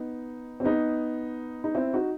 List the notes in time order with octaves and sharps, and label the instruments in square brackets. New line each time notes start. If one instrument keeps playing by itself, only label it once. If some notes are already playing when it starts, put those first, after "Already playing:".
Already playing: [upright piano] B3 D#4
C4
B3 D#4
D#4
C4 E4
D#4 F#4